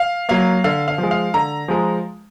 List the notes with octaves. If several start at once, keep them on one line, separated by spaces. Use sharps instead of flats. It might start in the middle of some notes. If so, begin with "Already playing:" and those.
Already playing: F5
F#3 A#3 F5
D3 F5
F5
F3
G#3
F5
D3 A#5
F3 G#3